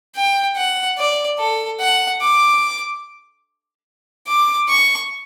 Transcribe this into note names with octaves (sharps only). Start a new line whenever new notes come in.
G5
F#5
D5
A4
F#5
D6
D6
C#6